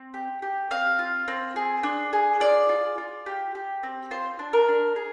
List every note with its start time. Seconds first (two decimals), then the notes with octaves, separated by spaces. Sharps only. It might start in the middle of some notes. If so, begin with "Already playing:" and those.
Already playing: C4
0.14 G4
0.42 G4
0.71 C4 F5
0.99 F4
1.28 C4
1.56 G#4
1.83 D4
2.13 G#4
2.40 F4 D5
2.69 F4
2.98 F4
3.26 G4
3.55 G4
3.83 C4
4.11 F4 C5
4.39 D4
4.53 A#4
4.68 D4
4.96 G#4